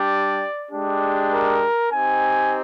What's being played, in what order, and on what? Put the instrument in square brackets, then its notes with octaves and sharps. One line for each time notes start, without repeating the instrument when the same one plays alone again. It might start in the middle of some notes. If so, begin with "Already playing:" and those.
Already playing: [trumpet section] G3 D4 G4 D5
G#3 D4 G4
A#4
C4 D#4 G4 G#5